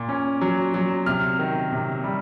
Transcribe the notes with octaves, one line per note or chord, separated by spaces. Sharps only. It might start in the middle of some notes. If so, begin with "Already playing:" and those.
Already playing: A#2
C#4
F#3
F#3
C3 F6
D#3
C3
G3